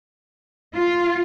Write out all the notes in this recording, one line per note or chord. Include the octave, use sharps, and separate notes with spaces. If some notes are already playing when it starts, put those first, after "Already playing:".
F4